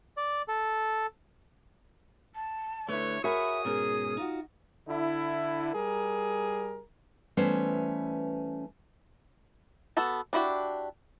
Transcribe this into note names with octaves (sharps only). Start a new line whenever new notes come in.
D5
A4
A5
D3 A3 E4 B4 C#5
F#4 G#4 A#4 C#5 E5 B5 D#6
G#2 B2 C#4 G#4 A#4
D#4 F4 F#4
D3 E4
G3 G#4 A#4
E3 G3 A3 B3 C#4 C5
B3 F#4 A4 A5
D4 E4 F#4 G4